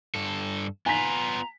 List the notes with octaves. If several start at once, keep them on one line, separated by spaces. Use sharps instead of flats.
G2 A4
B3 F4 G#5 A#5 B6